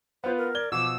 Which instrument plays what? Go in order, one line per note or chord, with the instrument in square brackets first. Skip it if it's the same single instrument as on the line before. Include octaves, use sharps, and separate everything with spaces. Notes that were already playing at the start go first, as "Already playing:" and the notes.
[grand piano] B3 F4 B4 [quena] C5
[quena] A#4
[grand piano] D5 G#6 G7
[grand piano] B2 F3 [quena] D6 [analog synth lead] E6